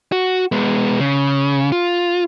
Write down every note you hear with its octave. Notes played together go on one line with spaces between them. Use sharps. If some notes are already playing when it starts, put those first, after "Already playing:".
F#4
G#3 B3
C#3
F4